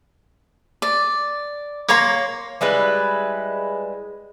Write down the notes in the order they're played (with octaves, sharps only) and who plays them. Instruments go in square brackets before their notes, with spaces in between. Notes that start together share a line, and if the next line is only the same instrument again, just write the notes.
[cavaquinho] D5
[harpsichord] A#3 [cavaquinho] C#5 A#5 C6
[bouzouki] G3 G#3 E4 B4